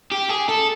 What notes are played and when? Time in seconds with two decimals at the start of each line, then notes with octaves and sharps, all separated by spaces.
0.12 G4
0.29 G#4
0.49 A4